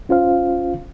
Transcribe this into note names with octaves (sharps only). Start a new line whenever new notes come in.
C#4 F4 C5 F5